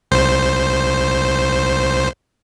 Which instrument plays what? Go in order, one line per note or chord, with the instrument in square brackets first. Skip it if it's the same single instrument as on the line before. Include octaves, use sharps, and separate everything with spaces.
[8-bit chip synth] C2 C5